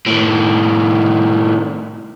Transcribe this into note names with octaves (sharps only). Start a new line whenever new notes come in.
A2 D#3